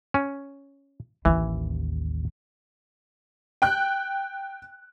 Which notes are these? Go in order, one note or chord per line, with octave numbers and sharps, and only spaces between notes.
C#4
A1 D#2 E3
G5 F#6